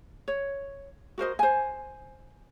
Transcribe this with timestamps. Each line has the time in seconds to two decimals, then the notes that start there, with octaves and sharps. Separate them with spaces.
0.28 C#5
1.18 F#4 A#4 C5 D#5
1.39 C5 G#5